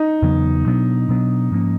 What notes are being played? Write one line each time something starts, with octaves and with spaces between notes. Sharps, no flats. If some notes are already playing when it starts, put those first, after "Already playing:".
Already playing: D#4
E2 C#3 F#3 B3
B2 F#3 B3 D4
B2 F#3 B3 D4
G#2 F3 A#3 C#4